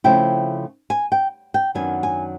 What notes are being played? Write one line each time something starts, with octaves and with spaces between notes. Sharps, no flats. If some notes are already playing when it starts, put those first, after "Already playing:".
C#3 F3 A3 C4 E4 G5
G#5
G5
G5
F#2 D#3 F#3 B3 D4 G#5
G#5